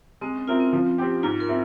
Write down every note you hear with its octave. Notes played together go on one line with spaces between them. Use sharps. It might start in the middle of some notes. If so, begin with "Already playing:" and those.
G#3 C4
C#4
C4 E4 F4 A#4
C4
F3
C4 G4
G#2 F4
A#4
C4 E4